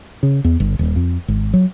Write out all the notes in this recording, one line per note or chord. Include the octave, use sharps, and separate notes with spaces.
C#3
E2
G1
D#1
F2
G#1
F#3